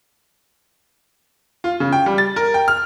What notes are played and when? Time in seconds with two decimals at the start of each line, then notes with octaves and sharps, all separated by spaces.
1.64 F4
1.80 C#3
1.92 G5
2.06 G3
2.18 A6
2.36 A#4
2.54 G5
2.68 F6